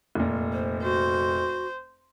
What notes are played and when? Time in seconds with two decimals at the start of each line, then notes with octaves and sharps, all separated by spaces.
0.15 F1 A#2
0.53 C5
0.83 F#4 C5